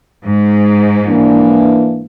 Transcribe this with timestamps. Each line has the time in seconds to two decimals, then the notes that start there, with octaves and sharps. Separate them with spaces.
0.25 G#2
1.07 E3 A#3 D4